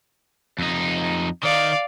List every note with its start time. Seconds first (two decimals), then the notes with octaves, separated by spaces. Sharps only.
0.59 F2 D#4
1.43 D#3 D5 F5